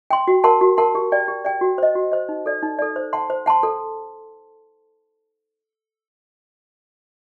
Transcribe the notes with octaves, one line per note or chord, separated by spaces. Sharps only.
G5 C6
F#4
A#4 F#5 A5 C6
F#4
A#4 F#5 A5 C6
G4
D5 G5
G4
D5 G5
F#4
C5 D#5
F#4
C5 D#5
D#4
A4 D5
D#4
A4 D5
C5
F#5 A5 C6
C5
F#5 A5 C6
A4